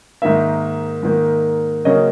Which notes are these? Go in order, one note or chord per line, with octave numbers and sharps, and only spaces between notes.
G#2 D#3 A#3 E5
G#2 D#3 A#3
C#3 F#3 A#3 C#4 D#5